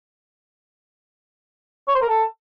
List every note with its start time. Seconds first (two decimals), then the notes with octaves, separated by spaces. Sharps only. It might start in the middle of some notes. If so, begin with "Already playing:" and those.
1.88 C#5
1.95 C5
2.02 A#4
2.09 A4